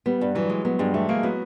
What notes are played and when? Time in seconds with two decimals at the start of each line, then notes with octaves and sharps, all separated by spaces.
0.06 G3 B3
0.21 G2
0.35 E3 F#3
0.49 G#3
0.65 F#3 B3
0.79 G2 G#3
0.94 E3 A3
1.09 G#3 A#3
1.23 F#3 B3